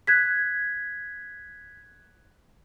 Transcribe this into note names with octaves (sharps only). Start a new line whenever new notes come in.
F#6 G#6 B6